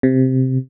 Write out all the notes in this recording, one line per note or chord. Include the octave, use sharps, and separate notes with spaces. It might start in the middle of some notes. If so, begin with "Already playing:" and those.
C3